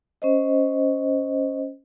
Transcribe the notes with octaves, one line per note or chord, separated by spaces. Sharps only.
C#4 C5 D#5